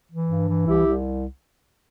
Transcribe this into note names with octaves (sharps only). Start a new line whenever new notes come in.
E3
G2
E3
C2 E4 G4
C2